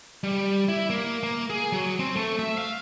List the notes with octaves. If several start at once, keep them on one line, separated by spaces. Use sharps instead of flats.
G3
E4
A#3
A#3
G#4
F#3
C4
A3
E5
F5